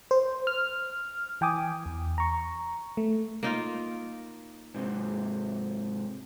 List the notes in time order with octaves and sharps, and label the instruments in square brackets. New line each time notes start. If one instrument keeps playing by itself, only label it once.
[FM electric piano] C5
F6
E3 G5 G#5 D6 D#6
E2
A#5 C#6
A3
[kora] A#3 D#4 F4
[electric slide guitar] G#2 C3